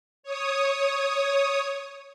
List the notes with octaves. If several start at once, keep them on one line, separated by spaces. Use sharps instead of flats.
C#5 D#6